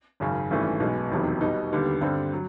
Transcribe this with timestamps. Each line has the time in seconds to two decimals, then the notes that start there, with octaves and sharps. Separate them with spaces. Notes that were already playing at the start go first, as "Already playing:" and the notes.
0.20 G#1 F#2 C#3
0.51 G#1 G2 E3 A3 C#4
0.80 B1 B2 G#3 B3
1.11 F1 E2 C3 D#3 F#3
1.41 B1 B2 G3 B3 D#4
1.71 D#2 D3 G3 B3
2.01 G2 D3 G3 C4
2.33 F#3